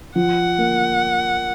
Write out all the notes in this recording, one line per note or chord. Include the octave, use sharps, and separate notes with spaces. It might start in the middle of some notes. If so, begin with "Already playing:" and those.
F3 F#5
A#3